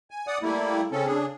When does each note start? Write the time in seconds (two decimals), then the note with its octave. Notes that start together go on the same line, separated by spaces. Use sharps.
0.11 G#5
0.27 D5 F#5 D#6
0.43 G3 A3 A#3 E4
0.92 C#3 C4 C#4 A4
1.06 C#3 D4 G#4